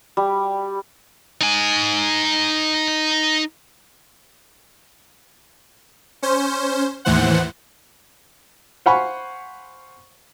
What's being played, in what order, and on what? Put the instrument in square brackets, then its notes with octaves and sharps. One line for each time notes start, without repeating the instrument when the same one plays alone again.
[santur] G3
[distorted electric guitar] D#4 G#5
[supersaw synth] C#4 C5
D#2 A2 E3 C5 F#5
[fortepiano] C5 F5 F#5 G#5 B5 C#6